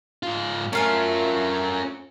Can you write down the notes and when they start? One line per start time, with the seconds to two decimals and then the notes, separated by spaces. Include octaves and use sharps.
0.23 G#2 F4
0.73 A3 C#4 F4 A#4 G#5